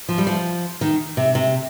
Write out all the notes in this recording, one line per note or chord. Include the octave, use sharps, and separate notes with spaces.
F3
G3
F3
D#3
C3
C3